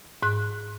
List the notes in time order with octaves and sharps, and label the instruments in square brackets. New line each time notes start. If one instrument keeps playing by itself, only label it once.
[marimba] G#2 F#6